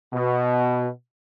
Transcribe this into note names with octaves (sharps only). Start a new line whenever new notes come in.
B2